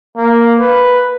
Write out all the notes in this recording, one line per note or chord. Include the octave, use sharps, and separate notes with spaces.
A#3
B4